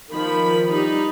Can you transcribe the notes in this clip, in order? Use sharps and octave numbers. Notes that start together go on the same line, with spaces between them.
D#3 F3 B5
G3 D#4 B5